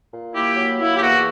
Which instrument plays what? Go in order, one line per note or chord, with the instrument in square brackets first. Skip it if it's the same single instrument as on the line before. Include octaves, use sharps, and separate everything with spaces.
[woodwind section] A#2
A#3 E4 G4
F#3
A#3 E4
G4
E2 F#4